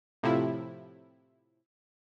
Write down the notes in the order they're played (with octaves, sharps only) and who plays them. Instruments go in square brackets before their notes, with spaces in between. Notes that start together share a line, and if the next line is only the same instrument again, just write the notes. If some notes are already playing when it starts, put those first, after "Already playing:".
[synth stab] A2 C3 F3 E4